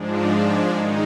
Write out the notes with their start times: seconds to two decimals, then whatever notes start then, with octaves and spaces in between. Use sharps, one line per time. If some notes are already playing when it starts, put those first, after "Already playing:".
Already playing: G#2 F3 G#3 D4
0.69 D#3 G#3 D#4